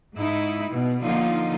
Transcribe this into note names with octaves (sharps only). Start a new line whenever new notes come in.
G#2 D#4 E4
B2
D3 F3 A#3 D#4 F4